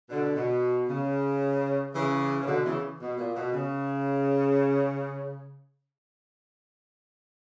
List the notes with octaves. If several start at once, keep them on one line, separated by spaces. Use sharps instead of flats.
B2 D3
B2
C#3
C#3 E3
C#3
B2 D3
C#3 E3
B2
A#2
B2
C#3